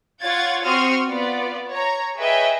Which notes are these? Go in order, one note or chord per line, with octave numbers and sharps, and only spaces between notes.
F4 C#5 F#5 G#6 A6
C4 F#4 C6 C#6 D#6 F6
B3 F4 D5
C#5 A#5
G#4 B4 C#5 D#5 E5 G5